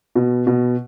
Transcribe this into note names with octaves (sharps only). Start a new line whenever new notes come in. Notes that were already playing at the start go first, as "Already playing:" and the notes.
B2
B2